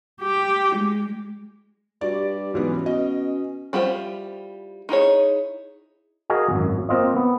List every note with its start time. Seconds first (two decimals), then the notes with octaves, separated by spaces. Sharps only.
0.21 G4
0.76 G#3
2.01 G2 F#4 D5
2.14 G4
2.54 G#2 E3 F#3 B3
2.68 C#4
2.86 B2 D#5
3.73 G3 E4 F4 G4 C5
4.89 D#4 E4 G#4 C#5
6.30 F#4 G#4 A#4 D#5 F5
6.51 G#1 F#2
6.89 A#3 C4 F4 D#5
7.16 B3